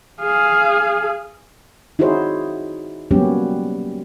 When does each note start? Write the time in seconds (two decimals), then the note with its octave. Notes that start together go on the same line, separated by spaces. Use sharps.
0.22 G#4 F5
1.99 D#4 E4 F#4 G#4 C5 C#5
3.11 F#3 G3 A#3 B3 C#4 G4